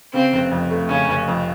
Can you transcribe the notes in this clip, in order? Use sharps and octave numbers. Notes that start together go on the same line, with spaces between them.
C#3 C4
F1
F2
A3
C#3 C#4
F1
F2